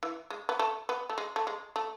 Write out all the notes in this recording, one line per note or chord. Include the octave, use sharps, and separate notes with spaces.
E3
G#3
B3
A3
B3
A3
G#3
A3
G#3
A3